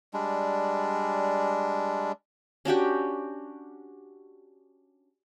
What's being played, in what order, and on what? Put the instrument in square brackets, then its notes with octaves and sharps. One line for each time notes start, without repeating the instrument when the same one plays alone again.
[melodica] G3 G#3 D4
[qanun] C#4 D4 F#4 G4